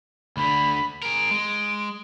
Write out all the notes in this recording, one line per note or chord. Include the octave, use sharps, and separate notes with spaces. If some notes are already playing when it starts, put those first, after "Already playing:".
D2 D3 B5
G#4 A#4 D7
G#3